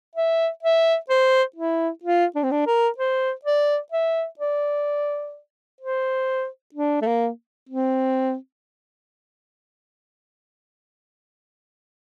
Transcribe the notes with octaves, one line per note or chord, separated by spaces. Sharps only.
E5
E5
C5
E4
F4
D4
C4
D4
A#4
C5
D5
E5
D5
C5
D4
A3
A#3
C4